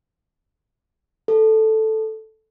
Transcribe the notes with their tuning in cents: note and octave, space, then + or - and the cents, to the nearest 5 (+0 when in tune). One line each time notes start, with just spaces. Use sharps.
A4 +0